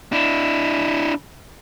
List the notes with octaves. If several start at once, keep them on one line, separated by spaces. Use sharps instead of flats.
D4 E4